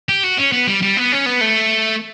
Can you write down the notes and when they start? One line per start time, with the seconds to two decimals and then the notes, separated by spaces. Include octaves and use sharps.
0.09 G4
0.24 F#4
0.38 C#4
0.52 B3
0.68 G3
0.82 G3
0.97 B3
1.12 C#4
1.26 B3
1.41 A3